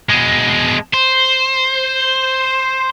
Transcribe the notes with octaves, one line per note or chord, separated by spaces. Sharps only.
B2 G#3
C5